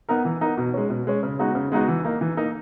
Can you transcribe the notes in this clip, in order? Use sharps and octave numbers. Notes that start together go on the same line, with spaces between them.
B3 D#4 A#4
E3
B3 D#4 A#4
B2
G#3 C#4
B2
G#3 C#4
C#3
G#3 B3 D#4 F#4
C#3
G#3 B3 D#4 F#4
E3
A#3 D#4 A#4
E3
A#3 D#4 A#4